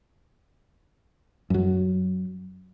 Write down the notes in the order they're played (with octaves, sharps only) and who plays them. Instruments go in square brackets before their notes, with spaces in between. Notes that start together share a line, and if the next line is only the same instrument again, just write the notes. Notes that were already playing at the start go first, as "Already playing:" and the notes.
[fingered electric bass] F#2 F#3